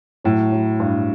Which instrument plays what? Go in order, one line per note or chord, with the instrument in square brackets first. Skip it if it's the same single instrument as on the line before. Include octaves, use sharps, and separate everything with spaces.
[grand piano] A2 [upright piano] F#3
[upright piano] F#3
G2